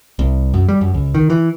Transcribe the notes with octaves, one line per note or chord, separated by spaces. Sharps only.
C2
F#2
G3
F#2
C#2
D#3
E3